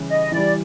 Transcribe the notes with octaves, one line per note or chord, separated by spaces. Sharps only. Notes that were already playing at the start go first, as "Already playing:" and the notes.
Already playing: C#3 E3 G3
D#5
E3 G3 D5